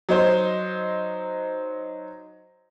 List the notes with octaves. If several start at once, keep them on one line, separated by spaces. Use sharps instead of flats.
F#3 D#4 C5